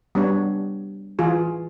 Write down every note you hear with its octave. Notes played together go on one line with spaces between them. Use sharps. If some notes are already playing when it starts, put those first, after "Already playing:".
G3 B3 D4 C#5
E3 F4 G#4